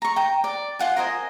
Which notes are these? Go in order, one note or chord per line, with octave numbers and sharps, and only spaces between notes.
A#5 C#6
G5 A#5
D5
F4 F#5 G#5
A#4 C5 D#5 G#5